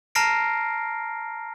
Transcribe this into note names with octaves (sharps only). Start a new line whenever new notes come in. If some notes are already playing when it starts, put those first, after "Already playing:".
A5 A#5 F6 A#6 C7 D7